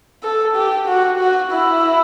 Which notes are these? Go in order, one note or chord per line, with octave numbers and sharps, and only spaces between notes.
A4
G4
F#4
F#4
E4